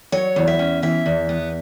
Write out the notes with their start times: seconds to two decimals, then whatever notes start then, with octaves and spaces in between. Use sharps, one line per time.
0.12 F#3 C#5
0.36 E2
0.47 E5
0.59 C#4
0.82 E3 E5
1.06 E2
1.29 B3